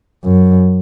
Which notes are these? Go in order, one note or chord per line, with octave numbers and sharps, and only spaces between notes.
F#2